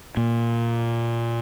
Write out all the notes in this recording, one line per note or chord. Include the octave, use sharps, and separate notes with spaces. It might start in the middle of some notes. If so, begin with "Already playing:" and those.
A#2